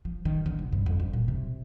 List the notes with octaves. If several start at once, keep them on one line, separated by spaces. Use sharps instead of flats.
F3
D#3
D3
C3
G2
F2
G2
A#2
C3